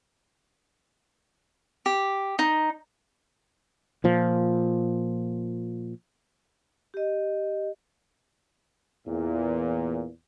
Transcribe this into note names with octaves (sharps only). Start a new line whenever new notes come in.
G4
D#4
A#2 F3
G4 D#5
E2 A#2